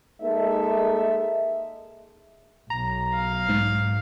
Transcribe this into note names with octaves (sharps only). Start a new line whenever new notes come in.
G#3 A#3 D#4 A4 E5
B1 A#5
F5
G#2